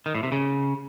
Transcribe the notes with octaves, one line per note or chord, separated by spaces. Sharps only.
D#3
A2
C3
C#3